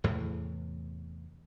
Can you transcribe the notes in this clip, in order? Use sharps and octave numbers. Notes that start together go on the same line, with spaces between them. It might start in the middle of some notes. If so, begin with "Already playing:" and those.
E2 A2 C3 E3